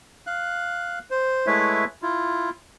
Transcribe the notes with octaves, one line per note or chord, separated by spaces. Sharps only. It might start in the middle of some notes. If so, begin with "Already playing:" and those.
F5 F#6
C5
G#3 A3 E4 B4 C#5 E5
E4 F4